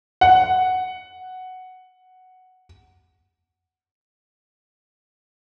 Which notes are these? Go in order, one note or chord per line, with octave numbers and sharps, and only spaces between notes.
F#5